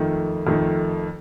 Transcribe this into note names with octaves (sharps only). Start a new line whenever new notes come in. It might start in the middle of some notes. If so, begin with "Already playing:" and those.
Already playing: F2 D#3 A3
F2 D#3 A3